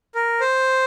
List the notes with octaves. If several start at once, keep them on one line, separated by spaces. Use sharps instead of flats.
A#4
C5